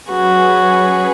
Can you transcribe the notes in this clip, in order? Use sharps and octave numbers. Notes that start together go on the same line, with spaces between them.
F#3 C#4 F#4 G#4 B4